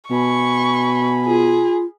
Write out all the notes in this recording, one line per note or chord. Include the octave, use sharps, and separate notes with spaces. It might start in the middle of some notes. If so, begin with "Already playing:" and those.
B2 G#5 B5 C#6
F4 G#4